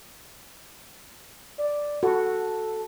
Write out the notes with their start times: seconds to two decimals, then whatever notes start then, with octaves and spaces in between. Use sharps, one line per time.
1.58 D5
2.03 F#4 A4